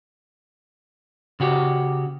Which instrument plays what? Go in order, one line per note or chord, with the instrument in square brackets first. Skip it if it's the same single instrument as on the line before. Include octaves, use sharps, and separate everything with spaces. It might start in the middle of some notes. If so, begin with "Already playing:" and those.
[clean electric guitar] C#3 F#4 G4